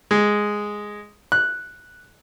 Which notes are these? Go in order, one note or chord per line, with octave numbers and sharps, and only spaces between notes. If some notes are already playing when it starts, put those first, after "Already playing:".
G#3
F#6